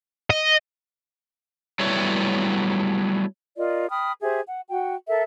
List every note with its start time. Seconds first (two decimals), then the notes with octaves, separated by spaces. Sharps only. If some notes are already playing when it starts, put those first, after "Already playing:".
0.30 D#5
1.79 F#3 G3 A3 B3 E4 C#5
3.57 F4 A#4 D5 D#5
3.90 G5 B5 D#6 F6
4.22 G4 G#4 C5 E5
4.46 F#5
4.69 F#4 F#5 G5
5.07 A4 A#4 E5